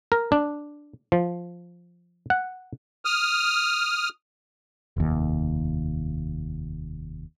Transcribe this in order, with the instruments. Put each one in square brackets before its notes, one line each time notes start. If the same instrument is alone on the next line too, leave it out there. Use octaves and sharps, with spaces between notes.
[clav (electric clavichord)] A#4
D4
F3
F#5
[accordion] D#6 F6
[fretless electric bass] F1 D#2